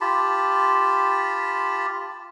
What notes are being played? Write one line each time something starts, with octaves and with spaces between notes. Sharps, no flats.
F4 G4 A5 B5